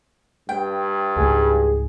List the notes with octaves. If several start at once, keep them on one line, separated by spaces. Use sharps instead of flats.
G2 G5
C#2 G#2 G#4